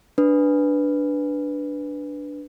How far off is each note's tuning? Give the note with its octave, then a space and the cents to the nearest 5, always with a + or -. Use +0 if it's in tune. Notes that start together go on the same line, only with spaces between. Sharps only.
D4 +0 B4 +0